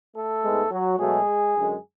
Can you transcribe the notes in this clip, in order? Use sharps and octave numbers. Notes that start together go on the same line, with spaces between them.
A3 A4
G#2 G#3 B3
F#3 F#4
B2 F#3 G#3 A3 G#4
F#2 D3 G#3